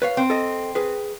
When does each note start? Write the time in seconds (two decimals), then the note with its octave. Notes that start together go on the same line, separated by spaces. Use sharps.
0.02 B4 C#5 F5
0.17 C4
0.30 A4 D#5
0.75 G#4 B4